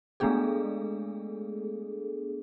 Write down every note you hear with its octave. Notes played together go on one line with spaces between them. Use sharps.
G#3 A3 B3 D4 G#4 A4